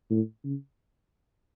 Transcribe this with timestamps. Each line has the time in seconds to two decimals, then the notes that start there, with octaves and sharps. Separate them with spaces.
0.10 A2
0.44 C#3